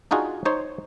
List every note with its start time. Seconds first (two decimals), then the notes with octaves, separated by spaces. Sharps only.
0.11 D4 D#4 F4 F#4 G#4
0.45 D#4 C5 C#5